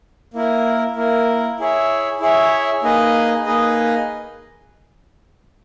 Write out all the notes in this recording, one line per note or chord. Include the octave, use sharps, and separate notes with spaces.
A#3 E4 A#4
A#3 E4 A#4
E4 G#4 C#5 E5
E4 G#4 C#5 E5
A#3 D#4 G#4 B4 D#5
A#3 D#4 G#4 B4 D#5